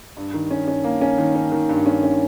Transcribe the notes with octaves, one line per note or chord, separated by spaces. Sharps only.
G2
D#3
C#4
C#4
A#3
C#4
D#3
C#4
D#3
G2
C#4
C#4